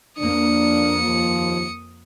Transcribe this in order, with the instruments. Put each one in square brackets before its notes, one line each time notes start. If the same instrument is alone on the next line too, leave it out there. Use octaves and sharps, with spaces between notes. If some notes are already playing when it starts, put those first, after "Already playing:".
[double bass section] F2 A#3 [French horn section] D4 [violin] D#6 C#7
[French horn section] D#2 F3